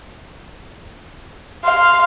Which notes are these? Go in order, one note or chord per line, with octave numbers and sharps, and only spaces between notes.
F5 C6